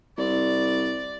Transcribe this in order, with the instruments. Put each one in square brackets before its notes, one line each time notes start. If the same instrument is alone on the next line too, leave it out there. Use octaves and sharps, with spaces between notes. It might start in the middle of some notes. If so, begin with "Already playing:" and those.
[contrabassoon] C2 [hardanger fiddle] D5